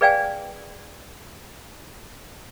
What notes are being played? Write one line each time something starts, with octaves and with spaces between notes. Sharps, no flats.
G#4 B4 D5 F5 G5 G#5